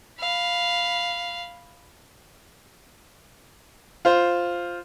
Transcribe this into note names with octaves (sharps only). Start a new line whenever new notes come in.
F5 B5
F4 C5